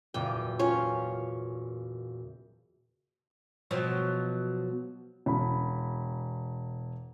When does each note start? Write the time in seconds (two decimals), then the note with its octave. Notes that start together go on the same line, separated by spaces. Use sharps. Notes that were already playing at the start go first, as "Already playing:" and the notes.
0.14 F#1 E2 A#2 G5
0.59 C#4 F4 C#5
3.71 B2 F3 F#3
5.26 E1 B5